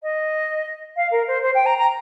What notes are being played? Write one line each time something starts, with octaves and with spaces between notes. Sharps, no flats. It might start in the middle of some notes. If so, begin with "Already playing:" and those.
D#5
F5
A#4
C5
C5
G5
A#5
A#5